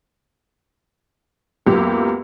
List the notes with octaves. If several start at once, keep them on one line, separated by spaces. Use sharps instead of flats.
C#2 F#2 A#3 B3 G4